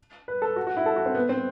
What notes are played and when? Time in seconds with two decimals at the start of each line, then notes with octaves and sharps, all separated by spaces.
0.28 B4
0.42 A4
0.56 F#4
0.67 F#4
0.77 E4
0.86 A4
0.96 F#4
1.06 C4
1.15 B3
1.29 C4